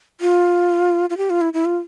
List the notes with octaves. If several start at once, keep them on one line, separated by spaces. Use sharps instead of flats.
F4
F4
G4
F4
E4
E4
F4